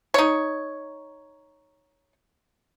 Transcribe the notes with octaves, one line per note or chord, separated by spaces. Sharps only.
D#4 C#5